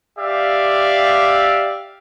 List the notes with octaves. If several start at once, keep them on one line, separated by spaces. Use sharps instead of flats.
G4 D5 E5 F5